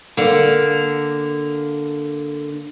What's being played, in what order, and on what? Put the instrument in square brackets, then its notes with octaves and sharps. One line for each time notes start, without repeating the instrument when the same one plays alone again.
[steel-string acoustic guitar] D3 A#3